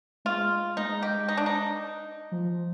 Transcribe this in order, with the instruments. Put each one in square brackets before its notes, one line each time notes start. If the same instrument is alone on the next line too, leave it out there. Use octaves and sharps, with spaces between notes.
[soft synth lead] G#3 [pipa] F4
[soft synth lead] G#3 [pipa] D#4
[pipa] G4
D#4
D4
D#4
[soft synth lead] F3